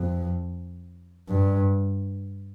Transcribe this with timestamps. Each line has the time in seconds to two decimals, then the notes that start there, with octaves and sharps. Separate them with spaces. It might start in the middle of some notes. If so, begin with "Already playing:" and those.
Already playing: F2
1.28 G2